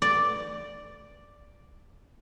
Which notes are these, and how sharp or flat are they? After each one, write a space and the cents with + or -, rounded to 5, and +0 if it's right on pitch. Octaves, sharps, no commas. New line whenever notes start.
D5 +0